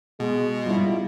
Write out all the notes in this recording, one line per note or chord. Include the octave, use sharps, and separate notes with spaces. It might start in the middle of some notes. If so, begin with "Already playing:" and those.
B2 G#3
G3 E4 F4